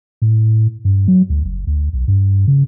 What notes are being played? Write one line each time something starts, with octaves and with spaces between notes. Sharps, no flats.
A2
G2
F#3
D2
F#1
D2
B1
G2
C#3